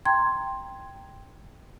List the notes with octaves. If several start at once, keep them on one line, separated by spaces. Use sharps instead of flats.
G5 A#5 C6 G#6